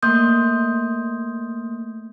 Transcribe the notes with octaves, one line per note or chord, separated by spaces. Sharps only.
A3 A#3 C6 D#6 G6